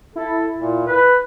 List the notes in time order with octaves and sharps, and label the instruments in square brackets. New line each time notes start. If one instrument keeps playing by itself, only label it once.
[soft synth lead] E4 [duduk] A4
[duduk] A#2
B4